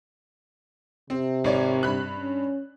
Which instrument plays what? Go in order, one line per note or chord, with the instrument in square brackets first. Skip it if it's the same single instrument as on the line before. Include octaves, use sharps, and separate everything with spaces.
[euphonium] C3 [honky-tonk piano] C4
[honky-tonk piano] G#1 C#5 D5
G2 B5 F#6
[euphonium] C#4